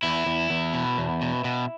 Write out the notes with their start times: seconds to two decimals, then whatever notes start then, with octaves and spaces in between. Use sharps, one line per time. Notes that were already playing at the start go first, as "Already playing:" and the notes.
0.03 E2 E4
0.26 E2
0.50 E2
0.73 B2
0.98 E2
1.21 B2
1.44 B2